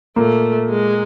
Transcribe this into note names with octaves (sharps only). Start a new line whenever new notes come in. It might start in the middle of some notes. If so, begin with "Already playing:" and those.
A#2 A3 A#3
G#3